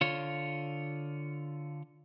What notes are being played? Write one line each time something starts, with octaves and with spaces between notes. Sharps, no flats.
D3 F4 C#5